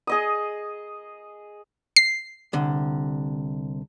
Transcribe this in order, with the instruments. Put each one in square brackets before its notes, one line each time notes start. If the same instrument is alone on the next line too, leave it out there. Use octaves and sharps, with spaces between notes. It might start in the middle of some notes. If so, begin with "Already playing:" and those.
[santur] G#4 D#5 D#6
[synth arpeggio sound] C7
[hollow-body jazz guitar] C2 D3